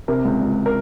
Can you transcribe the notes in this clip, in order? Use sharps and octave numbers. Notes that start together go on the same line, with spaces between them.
C3 A#4
C#2
C#2
A#4